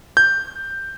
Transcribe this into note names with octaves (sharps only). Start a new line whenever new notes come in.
G6